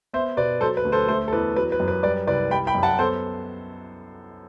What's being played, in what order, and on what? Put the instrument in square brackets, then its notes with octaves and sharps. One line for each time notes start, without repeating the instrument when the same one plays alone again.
[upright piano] B3 C5 E5
B2 B4 D5
F#3 A4 C5
B4
D2
A4 C5
A3 A4 C5
A4
E2 B4
F#3 B4
B4
F#2
B4
G3 B4 D5
C2 B4 D5
G3 G5 B5
G5 B5
F#2
F#5 A5
B3 A4 C5